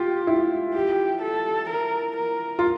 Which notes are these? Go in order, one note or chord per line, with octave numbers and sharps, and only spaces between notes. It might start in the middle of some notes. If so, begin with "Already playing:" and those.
Already playing: F4 G4
E4
G4
A4
A#4
A#4
F4